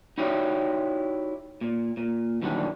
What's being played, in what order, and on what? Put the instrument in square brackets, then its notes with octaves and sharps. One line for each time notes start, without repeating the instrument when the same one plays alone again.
[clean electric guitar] D#4 E4 F#4 G4 C#5 D5
A#2
A#2
A#2 D#3 E3 F#3 G3 D4